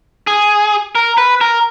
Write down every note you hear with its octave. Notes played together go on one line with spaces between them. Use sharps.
G#4
A#4
B4
A#4